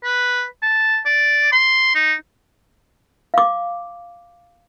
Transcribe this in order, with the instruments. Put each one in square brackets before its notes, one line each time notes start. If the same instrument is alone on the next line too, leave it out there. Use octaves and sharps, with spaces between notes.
[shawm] B4
A5
D5
C6
D#4
[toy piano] F5 D6